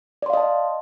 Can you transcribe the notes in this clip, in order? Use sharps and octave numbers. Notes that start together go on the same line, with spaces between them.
D5 D#5 F5 A5 C6